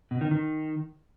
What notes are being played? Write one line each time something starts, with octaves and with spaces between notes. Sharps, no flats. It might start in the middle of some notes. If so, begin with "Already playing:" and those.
B2
D#3
D#3